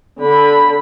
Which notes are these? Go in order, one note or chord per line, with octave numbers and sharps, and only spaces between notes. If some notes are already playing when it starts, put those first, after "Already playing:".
D3 B5